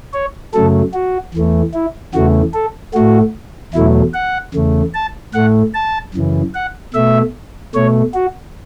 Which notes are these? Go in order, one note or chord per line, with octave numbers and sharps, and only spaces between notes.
C#5
F#2 C#3 F#3 A3 A4
F#4
E2 E3 A3
E4
E2 C#3 E3 A3 F#4
A4
A2 A3 F#4
E2 B2 F#3 A3 E4
F#5
E2 C#3 A3
A5
A2 A3 F#5
A5
F#2 C#3 E3
F#5
B2 A3 E5
B2 A3 C#5
F#4